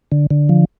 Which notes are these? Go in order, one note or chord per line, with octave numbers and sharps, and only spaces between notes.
D3
D3
F3